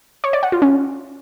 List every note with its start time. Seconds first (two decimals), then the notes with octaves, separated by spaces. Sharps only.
0.24 C#5
0.33 D5
0.43 F#5
0.52 F4
0.62 C#4